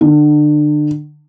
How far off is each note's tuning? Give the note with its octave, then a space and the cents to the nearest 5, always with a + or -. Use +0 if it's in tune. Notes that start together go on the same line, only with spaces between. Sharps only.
D3 +30